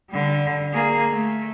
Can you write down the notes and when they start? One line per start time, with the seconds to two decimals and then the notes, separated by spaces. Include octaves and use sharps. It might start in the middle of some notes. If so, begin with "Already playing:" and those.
0.10 D3 G3
0.73 A#3 G#4
1.10 A3